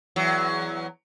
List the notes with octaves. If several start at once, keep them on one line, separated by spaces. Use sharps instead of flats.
E2 F#3